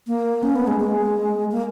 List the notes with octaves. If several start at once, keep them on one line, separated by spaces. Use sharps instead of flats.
A#3
C#4
B3
G#3
G#3
A#3